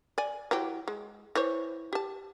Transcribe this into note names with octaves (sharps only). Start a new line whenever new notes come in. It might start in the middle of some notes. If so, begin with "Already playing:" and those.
D5 G#5
E3 F#3 G4
G#3
E3 C5 C#5
G4 A5